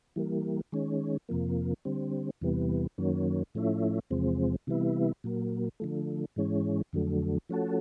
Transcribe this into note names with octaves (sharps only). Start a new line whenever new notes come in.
E3 G3 A#3
D#3 G#3 C#4
F2 C3 F3 A#3
D3 G3 C4
E2 C3 E3 G3 B3
F#2 D#3 F#3 A#3 C#4
A2 F3 A3 C#4 E4
E2 C3 F3 G#3 C4
C3 E3 G3 B3 E4
A#2 F#3 A#3
D3 F3 A3
G#2 E3 G#3 C#4
F2 D3 F#3 A3
F3 A3 C#4 F#4 A4